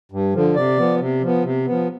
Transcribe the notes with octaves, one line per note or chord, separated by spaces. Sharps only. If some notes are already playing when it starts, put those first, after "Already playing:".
G2
D3 F3
C3 D5
F3 B3
C3
F3 B3
C3
F3 B3